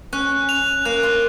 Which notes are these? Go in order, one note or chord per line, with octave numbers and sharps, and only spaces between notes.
C#4 F#6
F7
A#3 F#6
F4